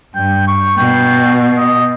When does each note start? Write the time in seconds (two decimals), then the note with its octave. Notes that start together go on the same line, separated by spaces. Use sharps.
0.15 G2 G5
0.48 C#6
0.77 B2 G5
1.58 D#5